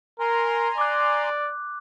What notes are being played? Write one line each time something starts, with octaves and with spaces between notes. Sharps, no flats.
A#4 G#5 A#5 C6
D5 D6 F#6